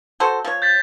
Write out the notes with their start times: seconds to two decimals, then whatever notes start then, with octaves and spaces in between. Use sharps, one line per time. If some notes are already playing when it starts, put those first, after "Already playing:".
0.20 F#4 A4 C5
0.45 F3 C#5
0.62 G6 A6 B6